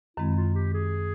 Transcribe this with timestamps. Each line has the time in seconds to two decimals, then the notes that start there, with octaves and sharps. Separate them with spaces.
0.17 F#2 D#3 G#3 C4 E4
0.36 F4
0.55 G4
0.74 G#4